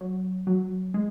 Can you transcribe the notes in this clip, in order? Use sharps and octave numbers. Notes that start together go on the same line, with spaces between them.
F#3
F#3
G#3